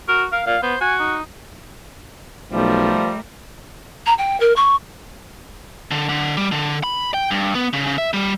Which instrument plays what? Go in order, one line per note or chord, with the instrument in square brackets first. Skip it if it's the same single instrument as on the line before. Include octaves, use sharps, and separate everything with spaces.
[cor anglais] F#4 [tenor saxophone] A#4
[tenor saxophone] A#4 [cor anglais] F5
[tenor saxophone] A#2 [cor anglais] F5
[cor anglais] B3 [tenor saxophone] C5
[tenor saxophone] F#4 [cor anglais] G#5
[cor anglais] D#4
[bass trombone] B1 [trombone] F3 [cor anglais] G3 [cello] A3 A#4
[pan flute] A#5
G5
A#4
C#6
[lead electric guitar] D3
D3
G3
D3
B5
G5
G2
B3
C#3
C#3
E5
G3